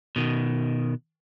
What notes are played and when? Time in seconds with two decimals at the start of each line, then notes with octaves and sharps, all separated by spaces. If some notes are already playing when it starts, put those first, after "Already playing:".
0.16 B2 D#3